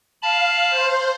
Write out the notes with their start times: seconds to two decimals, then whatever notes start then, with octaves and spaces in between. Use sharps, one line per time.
0.22 F5 A5 B5
0.70 C5